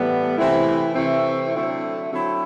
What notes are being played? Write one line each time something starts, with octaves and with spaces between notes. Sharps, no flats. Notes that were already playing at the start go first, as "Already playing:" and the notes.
Already playing: A2 E3 G3 B3
C3 E3 A3 C4 E4
C3 E3 A3 C4 E4
D3 F#3 A3 C4 E4
D3 F#3 A3 C4 E4